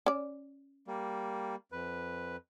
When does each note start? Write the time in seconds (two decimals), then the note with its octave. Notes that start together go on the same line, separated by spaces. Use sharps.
0.06 C#4 D5
0.88 G3 A#3
1.72 F2 B4